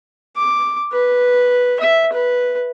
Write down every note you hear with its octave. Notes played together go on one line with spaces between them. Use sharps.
D6
B4
E5
B4